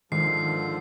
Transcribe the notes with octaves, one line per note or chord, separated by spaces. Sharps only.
G#2 D3 D#3 F3 C7